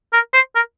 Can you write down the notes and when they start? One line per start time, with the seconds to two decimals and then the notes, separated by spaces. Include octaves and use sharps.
0.13 A#4
0.33 C5
0.55 A#4